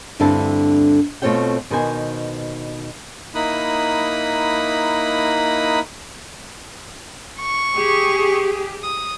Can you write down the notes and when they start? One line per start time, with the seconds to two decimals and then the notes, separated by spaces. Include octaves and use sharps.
0.19 D2 G2 D3 C4 E4 A5
1.22 B2 A3 C4 F4 C#5 G5
1.71 B2 D#3 B3 C5 G#5
3.35 A#3 D#4 E4 B5 D#6 F#6
7.41 C#6
7.76 G4 G#4
8.83 D#6